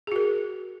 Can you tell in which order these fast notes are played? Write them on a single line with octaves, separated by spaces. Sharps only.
G#4 F#4 A#4